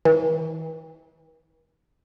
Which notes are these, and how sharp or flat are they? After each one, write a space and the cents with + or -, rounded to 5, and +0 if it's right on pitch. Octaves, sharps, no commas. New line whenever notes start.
E3 -40